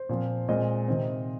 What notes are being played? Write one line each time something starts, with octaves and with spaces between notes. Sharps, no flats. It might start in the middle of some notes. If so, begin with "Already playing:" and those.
Already playing: C5
A#2 F3 C4
A#2 G#3 C4 D#5
C3 D#3 C4